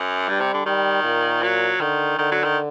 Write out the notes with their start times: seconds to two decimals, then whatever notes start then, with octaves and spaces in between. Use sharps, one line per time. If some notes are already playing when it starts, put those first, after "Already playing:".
Already playing: F#2
0.28 G2 G3
0.40 C3
0.53 D3
0.66 D#3 G3
1.04 A#2
1.43 F#3
1.80 D3 D#3
2.18 D3 D#3
2.31 F#3
2.44 D#3